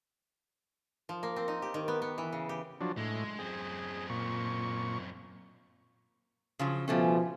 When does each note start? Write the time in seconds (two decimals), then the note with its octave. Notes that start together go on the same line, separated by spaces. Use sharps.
1.09 F3
1.23 A#3
1.36 C4
1.48 D#4
1.62 G4
1.74 D#3
1.88 B3
2.02 B3
2.18 E3
2.32 C#3
2.49 G4
2.81 F3 F#3 D4
2.97 A2 G#3
3.39 F#2 C4 G#4
4.10 A#2 C#6
6.59 C#3 F3 F#3
6.88 B2 F3 G3 A3 C#4 G#5